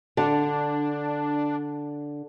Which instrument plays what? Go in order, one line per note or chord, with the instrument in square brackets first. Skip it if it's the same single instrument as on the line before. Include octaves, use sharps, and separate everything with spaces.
[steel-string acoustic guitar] D3 [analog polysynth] D4